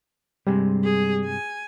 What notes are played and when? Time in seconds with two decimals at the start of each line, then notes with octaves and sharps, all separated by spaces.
0.47 G2 C3 G3 G#3
0.84 G#4
1.25 G#5